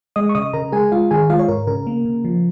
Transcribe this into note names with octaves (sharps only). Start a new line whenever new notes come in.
G#3 D#5 D#6
C#6
C#3 D#5 D#6
C#3 A#4 A#5
G#3 G#4 G#5
G#3 F4 F5
D#3 G#4 G#5
G#3 F4 F5
C#5
G#2 A#4
C#3 A#4
A#3
C#3
F3